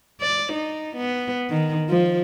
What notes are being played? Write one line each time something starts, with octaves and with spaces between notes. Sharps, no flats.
D5
D#4
B3
D#3
F3